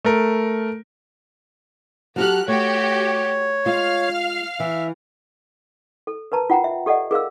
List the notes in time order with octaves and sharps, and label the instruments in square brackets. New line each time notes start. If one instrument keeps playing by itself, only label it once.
[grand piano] A3 A#4
[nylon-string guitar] F#3 F#4 G4 [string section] A4 F6 F#6
[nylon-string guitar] A3 [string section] F#4 G4 [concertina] C#5
[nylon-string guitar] G#3 F4 [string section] F5 F6
[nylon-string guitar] E3 [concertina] E5
[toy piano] A4
A#4 B4 A5 A#5
F4 F#5 G5 A#5
E5
G4 A4 D5 D#5 F#5
G#4 A#4 F5 E6